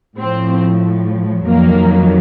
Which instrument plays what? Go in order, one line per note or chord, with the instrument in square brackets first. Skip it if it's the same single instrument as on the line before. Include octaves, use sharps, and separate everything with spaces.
[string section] A2 F3 C4
F2 D#3 F#3 A#3